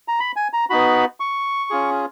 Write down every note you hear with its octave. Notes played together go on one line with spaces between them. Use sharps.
A#5
B5
G#5
A#5
B3 D#4 F#4 B5
C#6
C#4 F4 G#4